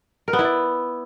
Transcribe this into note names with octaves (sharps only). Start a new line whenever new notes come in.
A#4
B3
E4
D5